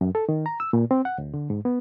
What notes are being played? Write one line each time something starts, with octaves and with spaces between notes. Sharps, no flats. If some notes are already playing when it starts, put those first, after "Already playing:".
F#2
A4
D#3
A#5
E6
A#2
C4
F#5
D2
D3
G#2
B3